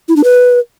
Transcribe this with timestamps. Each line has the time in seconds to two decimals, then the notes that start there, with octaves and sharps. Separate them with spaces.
0.08 E4
0.16 D4
0.24 B4